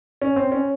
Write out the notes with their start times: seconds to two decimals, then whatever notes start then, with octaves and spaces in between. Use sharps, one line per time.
0.22 C#4
0.36 C4
0.52 C#4